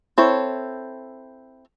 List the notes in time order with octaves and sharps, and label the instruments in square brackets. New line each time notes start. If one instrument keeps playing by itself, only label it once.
[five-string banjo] C4 E4 A4 C#5